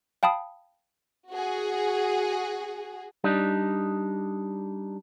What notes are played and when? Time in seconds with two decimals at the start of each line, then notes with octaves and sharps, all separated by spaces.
0.23 F5 G5 A5 B5 D#6
1.30 F#4 G#4
3.24 G3 D4 D#4